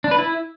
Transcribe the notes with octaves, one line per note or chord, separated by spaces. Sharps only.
D4
B4
E4